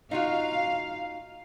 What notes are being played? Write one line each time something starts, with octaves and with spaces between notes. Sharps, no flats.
D#4 F4 F#4 F5